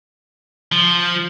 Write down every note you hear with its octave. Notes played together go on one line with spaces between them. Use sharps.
F3